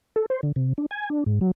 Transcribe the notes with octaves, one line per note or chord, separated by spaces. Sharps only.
A4
C5
D3
C3
D4
G#5
D4
G#2
F#3